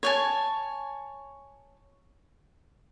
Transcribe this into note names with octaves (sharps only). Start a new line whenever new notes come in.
C#5 G#5 A5